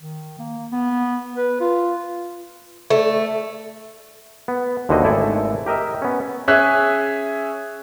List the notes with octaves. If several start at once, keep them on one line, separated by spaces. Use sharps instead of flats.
D#3
A#3
B3
B4
F4
A3
B3
D#2 D3 E4 F#4 C5 D#5
G#1 A3 E4 A4 D5 G#5
G4 A#4 D#5 E5
B3 C#4
C#4 G#4 E5 F#6